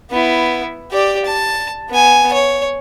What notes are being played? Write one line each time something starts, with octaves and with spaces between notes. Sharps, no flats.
B3 E4
G4 D5
A5
B3 G#5
C#5